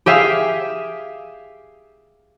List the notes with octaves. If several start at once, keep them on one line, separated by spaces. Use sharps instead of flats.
G4 G#4 E5 F5